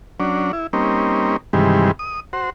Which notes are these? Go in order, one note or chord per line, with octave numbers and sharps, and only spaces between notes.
F#3 C#4 D4
E4
G3 A#3 C4 C#4 D#4
G2 C3 D#3 E3 G3 G#3
D#6
F#4 C5